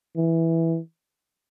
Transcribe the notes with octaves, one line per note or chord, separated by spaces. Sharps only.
E3